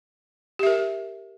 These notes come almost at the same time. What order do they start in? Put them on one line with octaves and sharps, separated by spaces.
G4 E5 A#4